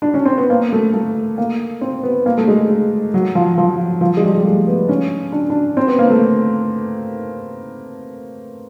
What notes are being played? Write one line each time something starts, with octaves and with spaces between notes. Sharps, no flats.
D4
C#4
C4
B3
A#3
A3
A3
A#3
C4
B3
A#3
A3
G#3
F#3
F3
F3
F3
G#3
G3
G3
A3
B3
C#4
D4
D4
C4
B3
A#3
A3